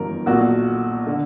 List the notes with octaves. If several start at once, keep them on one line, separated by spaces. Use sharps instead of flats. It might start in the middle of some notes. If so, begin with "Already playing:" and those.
Already playing: G1 F#2 E3 A#4
B1 A#2 F#4
D3